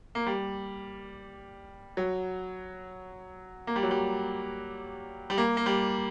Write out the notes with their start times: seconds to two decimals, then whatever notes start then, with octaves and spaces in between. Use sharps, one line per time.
0.15 A#3
0.26 G3
1.97 F#3
3.67 A#3
3.76 G3
3.83 F#3
3.91 G3
5.30 G3
5.38 A#3
5.57 A#3
5.66 G3